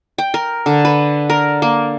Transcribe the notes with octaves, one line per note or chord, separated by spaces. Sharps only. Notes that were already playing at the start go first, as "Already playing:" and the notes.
G5
A#4
D3
B4
A#4
A#3